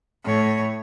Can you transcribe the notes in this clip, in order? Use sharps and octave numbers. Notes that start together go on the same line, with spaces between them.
A2 C#5